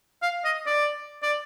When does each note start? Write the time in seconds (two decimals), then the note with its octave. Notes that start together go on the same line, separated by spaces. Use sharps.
0.22 F5
0.44 D#5
0.66 D5
1.23 D5